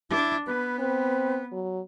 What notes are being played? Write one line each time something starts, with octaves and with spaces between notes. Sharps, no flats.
D4 E4
B3 B4
C4 B4
F#3